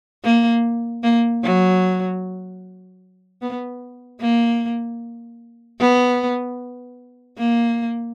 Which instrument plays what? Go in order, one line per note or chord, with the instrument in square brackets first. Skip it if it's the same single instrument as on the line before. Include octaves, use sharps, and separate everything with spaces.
[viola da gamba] A#3
A#3
F#3
B3
A#3
B3
A#3